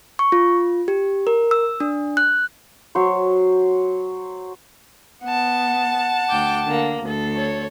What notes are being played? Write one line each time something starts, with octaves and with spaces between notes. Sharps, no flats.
C#6
F4
G4
A#4
E6
D4
F#6
F#3 C5 C#5
B3 F#5 A5
D2 G5 D6
D3 A#3
D2 A4
C#5